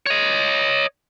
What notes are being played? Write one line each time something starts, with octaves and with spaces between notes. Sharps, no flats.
C#5 D#5